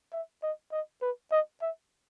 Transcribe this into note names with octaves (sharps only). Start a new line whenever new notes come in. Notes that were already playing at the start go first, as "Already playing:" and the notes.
E5
D#5
D#5
B4
D#5
E5